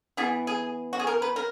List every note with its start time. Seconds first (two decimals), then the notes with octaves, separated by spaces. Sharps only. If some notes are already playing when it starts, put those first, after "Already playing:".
0.17 E3 B3 E4 G#4
0.47 G#4
0.93 F#4
0.99 G#4
1.07 A#4
1.22 B4
1.36 A#4